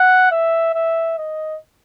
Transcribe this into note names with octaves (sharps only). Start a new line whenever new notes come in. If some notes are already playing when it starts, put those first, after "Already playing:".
Already playing: F#5
E5
E5
D#5